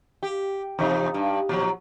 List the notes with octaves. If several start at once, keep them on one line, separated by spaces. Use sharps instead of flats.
G4
E2 C3 D#4
G2
A#2 F3 F#3